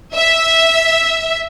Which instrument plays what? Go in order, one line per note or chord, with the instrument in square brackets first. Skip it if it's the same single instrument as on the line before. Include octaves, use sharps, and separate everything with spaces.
[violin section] E5